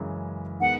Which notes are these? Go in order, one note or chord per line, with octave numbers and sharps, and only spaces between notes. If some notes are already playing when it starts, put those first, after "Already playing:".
Already playing: F#2 C#3 E3 G#3
D#3 G#3 B3 F#5